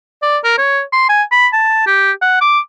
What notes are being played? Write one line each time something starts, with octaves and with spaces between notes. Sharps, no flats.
D5
A#4
C#5
C6
G#5
B5
A5
G4
F#5
D6